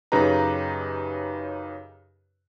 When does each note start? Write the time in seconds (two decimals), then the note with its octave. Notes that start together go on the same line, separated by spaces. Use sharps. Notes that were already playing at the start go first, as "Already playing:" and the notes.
0.12 F#2 C#3 D#4 G4 B4 A#5